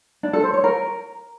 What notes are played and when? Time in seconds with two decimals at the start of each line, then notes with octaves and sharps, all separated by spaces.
0.23 D4
0.33 A4
0.44 C5
0.54 C#5
0.64 A#4